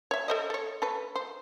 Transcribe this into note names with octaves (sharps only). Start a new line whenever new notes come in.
C#5 E5
A4 C5 D#5
A4 C#5
A3 A4 B4
C5